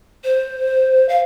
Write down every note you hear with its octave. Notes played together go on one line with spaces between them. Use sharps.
C5
F5